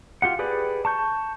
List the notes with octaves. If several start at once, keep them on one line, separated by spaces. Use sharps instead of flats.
F4 G4 F#5
G4 G#4 B4 D5
A5 C#6 G6